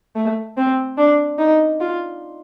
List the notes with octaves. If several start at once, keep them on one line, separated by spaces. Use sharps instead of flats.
A3
C4
D4
D#4
F4